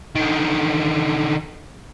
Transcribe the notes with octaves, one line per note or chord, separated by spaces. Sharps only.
D3 D#3